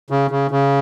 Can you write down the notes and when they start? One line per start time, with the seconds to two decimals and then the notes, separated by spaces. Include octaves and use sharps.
0.10 C#3
0.31 C#3
0.51 C#3